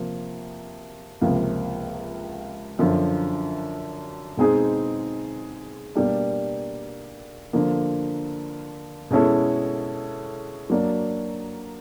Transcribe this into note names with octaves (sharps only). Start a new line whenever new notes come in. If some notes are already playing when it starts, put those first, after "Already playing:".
Already playing: C3 F3 A#3
C#2 C3 F3 A#3
F#2 D3 F3
B2 G#3 C4 D#4 G#4
B2 G3 A#3 D4
D3 F3 A#3
B2 G#3 C#4 E4 A4
F#3 A#3 D4